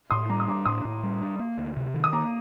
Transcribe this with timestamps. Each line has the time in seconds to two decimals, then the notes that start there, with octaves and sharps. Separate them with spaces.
0.11 A2 C6 D#6
0.29 G3 A#5 D6
0.40 D#6
0.48 D4 A#5 D6
0.66 A2 C6 D#6
0.85 A2
1.03 G3
1.21 D4
1.39 A#3
1.58 D2
1.77 C3
1.94 D#3
2.04 D#6
2.13 A#3 A#5 D6